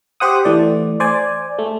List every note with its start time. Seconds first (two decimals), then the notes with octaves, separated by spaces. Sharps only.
0.20 G4 C5 F#5 D#6
0.45 E3 A3 D5
1.00 C5 D5 G#5
1.59 A3